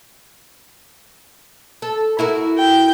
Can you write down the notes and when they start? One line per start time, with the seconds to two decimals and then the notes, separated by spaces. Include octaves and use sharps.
1.82 A4
2.19 E4 F#4 A#4
2.58 G5